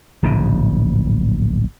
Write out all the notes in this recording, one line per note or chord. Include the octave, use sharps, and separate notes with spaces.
D1 A#1 G#2 C#3